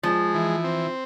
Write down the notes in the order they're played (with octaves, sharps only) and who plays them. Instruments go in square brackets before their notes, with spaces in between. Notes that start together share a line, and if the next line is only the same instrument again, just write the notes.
[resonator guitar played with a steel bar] F3 [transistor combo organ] G#3
[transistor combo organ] E3
C4